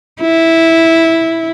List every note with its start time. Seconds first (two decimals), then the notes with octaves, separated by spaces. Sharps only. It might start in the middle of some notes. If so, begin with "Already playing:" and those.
0.21 E4